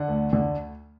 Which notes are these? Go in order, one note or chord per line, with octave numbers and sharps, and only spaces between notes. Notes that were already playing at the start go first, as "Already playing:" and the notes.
Already playing: D3 F#5
D2
D3